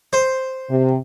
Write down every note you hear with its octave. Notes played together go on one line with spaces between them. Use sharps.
C5
C3